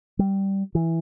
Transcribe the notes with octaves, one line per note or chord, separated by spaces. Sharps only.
G3
E3